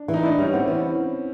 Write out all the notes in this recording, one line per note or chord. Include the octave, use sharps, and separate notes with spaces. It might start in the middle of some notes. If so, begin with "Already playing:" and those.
Already playing: D4
E3
D#4
D4 E4
G3 C#4
B3 C4
E3 C#4